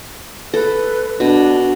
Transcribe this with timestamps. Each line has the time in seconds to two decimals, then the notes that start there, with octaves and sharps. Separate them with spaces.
0.54 A4 B4
1.20 B2 D4